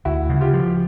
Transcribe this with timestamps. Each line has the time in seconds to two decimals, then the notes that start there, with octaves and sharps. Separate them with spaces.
0.05 D2 E4 F#4
0.29 C#3
0.41 F4 G4
0.53 F3